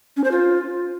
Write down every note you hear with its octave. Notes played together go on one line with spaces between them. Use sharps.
C#4
C5
F4